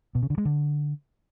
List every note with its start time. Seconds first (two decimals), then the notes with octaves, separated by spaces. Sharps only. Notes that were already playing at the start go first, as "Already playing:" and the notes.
0.15 B2
0.23 C#3
0.30 D3
0.38 G#3
0.45 D3